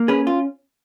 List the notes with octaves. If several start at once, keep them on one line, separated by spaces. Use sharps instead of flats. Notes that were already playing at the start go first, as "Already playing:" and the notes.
Already playing: A#3
C#4 G#4 B4
F4